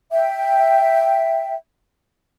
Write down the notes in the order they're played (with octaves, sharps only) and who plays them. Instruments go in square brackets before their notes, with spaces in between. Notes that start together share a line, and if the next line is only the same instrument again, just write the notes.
[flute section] E5 G5